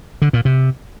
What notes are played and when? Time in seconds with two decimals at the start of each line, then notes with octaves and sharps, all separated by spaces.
0.22 D3
0.33 A#2
0.45 C3